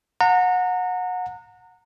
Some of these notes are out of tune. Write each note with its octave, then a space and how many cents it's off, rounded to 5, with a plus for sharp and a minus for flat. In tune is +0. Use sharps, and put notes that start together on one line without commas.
F#5 -25 A#5 -30